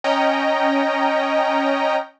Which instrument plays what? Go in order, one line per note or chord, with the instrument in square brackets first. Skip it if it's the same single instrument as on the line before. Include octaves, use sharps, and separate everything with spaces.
[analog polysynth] C#4 D#5 G5 A#5